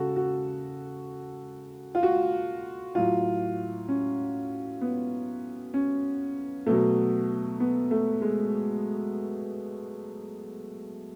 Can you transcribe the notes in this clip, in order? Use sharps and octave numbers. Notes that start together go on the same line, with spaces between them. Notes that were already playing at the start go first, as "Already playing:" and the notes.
Already playing: C#3 F#4 A4
F#4
F4
F#4
A2 F#3 F4
C#4
B3
C#4
B2 F#3 A3
B3
A3
G#3